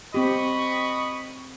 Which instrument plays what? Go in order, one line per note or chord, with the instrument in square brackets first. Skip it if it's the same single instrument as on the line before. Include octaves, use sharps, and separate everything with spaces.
[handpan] C4 G4 [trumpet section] D#5 B5 C#6